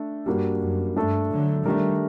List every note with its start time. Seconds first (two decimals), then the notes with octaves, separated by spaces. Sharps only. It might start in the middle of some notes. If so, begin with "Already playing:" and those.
Already playing: A3 D4 A4
0.26 G2 G3 A#3 D4 F#4
0.62 F#2
0.96 G2 A3 D4 A4
1.31 D3 F#3
1.65 D#3 G3 A3 D4 G4 A#4